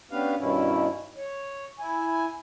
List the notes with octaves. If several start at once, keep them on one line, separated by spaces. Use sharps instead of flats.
B3 C#4 D4 G4 B4 F5
G2 B2 D#3 C#4 E4
C#5
E4 G#5